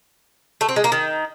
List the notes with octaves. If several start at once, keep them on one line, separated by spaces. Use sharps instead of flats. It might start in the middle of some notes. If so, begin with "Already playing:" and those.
A3
C4
G#3
A#3
D#3